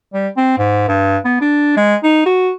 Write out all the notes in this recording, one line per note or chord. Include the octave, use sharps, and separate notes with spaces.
G3
C4
G#2
G2
B3
D4
G#3
D#4
F#4